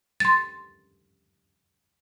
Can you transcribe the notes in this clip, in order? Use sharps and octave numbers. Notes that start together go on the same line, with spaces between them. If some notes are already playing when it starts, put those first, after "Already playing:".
C6 A6